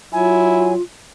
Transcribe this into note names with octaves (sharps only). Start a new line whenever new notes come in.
F#3 E4 F4 G#5